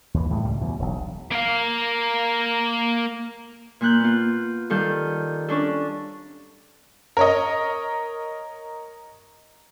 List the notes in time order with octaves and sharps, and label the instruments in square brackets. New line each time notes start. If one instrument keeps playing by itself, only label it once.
[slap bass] D#2 E3
A2 G3 G#3
C#2 A2 G3
E2 B2
E1 B1
[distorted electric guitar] A#3 F5
[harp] A#2 A#3 F#6 G6
B3 F4
D#3 G3 A4 F5 G6
C#4 D4 A4
[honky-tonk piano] A#4 C#5 D#5